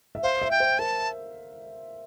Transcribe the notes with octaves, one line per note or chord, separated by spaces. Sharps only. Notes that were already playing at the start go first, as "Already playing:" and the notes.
E5
C5 F5
E5
G5
C5
A#4 A5